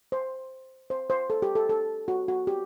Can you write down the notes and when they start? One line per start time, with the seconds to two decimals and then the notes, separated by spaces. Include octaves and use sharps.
0.12 C5
0.90 C5
1.10 C5
1.30 A4
1.42 G4
1.55 A4
1.69 A4
2.08 F#4
2.28 F#4
2.47 G4